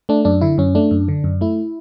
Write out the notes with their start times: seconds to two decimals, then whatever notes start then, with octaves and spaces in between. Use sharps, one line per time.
0.09 A3 D4
0.25 F#2 D4
0.41 D3 E4
0.58 F#2 C#4
0.75 A3 D4
0.91 F#2
1.08 D3
1.24 F#2
1.41 A3 E4